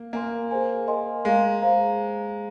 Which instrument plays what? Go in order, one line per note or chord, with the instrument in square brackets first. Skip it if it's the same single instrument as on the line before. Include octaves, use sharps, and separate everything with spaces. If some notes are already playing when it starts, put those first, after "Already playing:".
Already playing: [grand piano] A#3
[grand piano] A#3 [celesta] A#4 G#5 C6
[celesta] G#4 C5 G#5
A#4 D#5 G#5 C6
[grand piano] G#3 [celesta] G#4 F5 A#5
[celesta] C5 F5 A#5